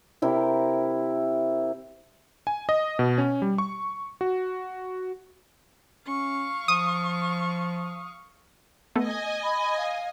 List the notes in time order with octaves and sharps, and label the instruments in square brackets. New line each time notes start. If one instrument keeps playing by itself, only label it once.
[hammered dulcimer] C3 E4 G4 A#4
[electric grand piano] G#5
D#5
B2
C#4
G3
C#6
F#4
[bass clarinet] C#4 [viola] F5 C#6
[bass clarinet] F3 [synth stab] D#6
[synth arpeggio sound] A3 B3 A4 [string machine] D#5 G#5
[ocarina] B5
F5